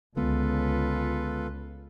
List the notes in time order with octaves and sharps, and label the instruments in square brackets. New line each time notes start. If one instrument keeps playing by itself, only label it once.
[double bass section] C#2 [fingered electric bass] D3 G#3 B3 [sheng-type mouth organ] F4 A4 B4